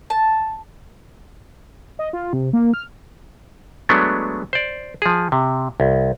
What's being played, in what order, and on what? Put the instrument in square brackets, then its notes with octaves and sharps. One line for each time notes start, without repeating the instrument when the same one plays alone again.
[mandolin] A5
[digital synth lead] D#5
F4
C3
A#3
F6
[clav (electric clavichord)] F#3 G#3 A3 B3 D4
C5 D5
F3 G#4
C3
C2